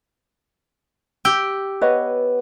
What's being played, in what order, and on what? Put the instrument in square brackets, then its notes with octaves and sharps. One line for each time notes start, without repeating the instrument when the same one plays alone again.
[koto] G4 [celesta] E6 G6 G7
[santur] B3 [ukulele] B4 C#5 D#5